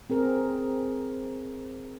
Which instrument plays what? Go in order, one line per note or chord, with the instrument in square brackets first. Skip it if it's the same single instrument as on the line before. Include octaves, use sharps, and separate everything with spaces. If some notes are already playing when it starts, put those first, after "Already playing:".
[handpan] C4 G#4 A#4